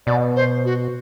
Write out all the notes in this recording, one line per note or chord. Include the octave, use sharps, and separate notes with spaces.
B2 D5
C5
F#4